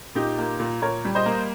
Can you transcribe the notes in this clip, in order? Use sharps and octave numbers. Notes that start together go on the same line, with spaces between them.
A#2 D#4 G4
A#3
A#2
A#2 A#4 C#5
G3
C5 D#5
A#3